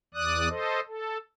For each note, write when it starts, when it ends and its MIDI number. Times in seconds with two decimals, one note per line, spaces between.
0.14 0.49 40
0.14 0.49 74
0.14 0.49 87
0.14 0.49 90
0.49 0.80 69
0.49 0.80 72
0.49 0.80 75
0.87 1.18 69